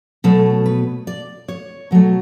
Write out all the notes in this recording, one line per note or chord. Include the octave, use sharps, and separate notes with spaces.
B2 F#3 A3 A4
B4
D5
C#5
B2 F#3 A3